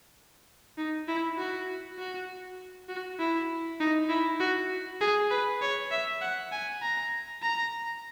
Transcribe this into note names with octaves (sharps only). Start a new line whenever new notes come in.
D#4
E4
F#4
F#4
F#4
E4
D#4
E4
F#4
G#4
B4
C#5
E5
F#5
G#5
A#5
A#5